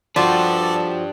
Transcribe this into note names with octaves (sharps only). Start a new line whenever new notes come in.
F3 D4 F#4 G4 A4 D5